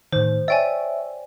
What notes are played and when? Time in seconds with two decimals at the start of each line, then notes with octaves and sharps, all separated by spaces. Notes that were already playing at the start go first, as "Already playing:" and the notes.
0.12 A2 D#3 C5
0.48 C#5 D5 E5 G5 G#5